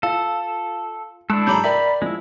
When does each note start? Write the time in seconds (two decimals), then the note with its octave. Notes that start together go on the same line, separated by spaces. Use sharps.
0.03 F4 A4 F5
1.30 G#3 D4 E4 A4
1.47 G#2 F#3 G#3 A#5 B5 D6 G6
1.64 A#4 D5 E5 G5 B5
2.02 F3 G#3 E4